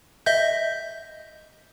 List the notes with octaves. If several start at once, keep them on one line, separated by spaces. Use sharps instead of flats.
D#5 E5 G6